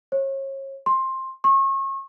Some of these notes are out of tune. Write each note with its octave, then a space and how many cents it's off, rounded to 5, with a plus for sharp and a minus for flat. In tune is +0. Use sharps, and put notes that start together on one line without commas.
C#5 -35
C6 +15
C#6 -35